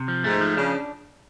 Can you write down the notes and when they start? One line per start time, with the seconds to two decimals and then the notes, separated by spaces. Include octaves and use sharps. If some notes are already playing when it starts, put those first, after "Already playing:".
Already playing: C3
0.08 F3
0.24 G#2 A3
0.40 F3
0.57 C#3 D4